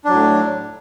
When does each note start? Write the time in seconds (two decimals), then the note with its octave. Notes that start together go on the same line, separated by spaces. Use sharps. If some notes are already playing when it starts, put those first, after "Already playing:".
0.04 D4
0.09 F#3
0.13 A2